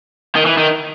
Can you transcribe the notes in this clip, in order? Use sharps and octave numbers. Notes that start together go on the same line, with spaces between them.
D#3
E3
D#3